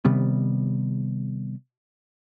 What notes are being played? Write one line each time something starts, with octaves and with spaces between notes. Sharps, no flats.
C3 D#3 G3 B3